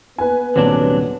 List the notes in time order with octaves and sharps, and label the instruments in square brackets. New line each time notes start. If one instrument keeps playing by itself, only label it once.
[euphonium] B3 [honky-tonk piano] B4 G#5
[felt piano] D#1 [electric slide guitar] C3 F#3 D4